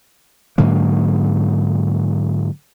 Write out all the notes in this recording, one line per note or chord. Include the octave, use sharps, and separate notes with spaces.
G#2 D3 F#3 A#3